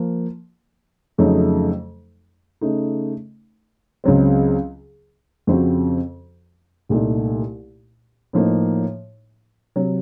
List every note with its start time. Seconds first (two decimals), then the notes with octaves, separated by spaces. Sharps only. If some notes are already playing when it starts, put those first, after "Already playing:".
Already playing: F3 A#3
1.18 F2 C#3 F#3 A3 D#4
2.61 C#3 A3 D#4
4.04 C#2 C#3 F#3 C4
5.47 F2 C#3 F3 C4 F#4
6.89 C2 A#2 A3 D#4
8.33 A2 F3 A#3 D#4
9.76 C3 F#3